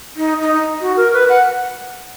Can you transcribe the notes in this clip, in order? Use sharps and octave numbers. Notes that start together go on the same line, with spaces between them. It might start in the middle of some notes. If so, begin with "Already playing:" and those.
D#4
D#4
F#4
A#4
B4
F#5